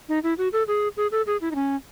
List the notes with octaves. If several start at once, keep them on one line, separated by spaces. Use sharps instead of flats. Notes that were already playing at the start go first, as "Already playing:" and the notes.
D#4
E4
F#4
A4
G#4
G#4
A4
G#4
E4
D#4
C#4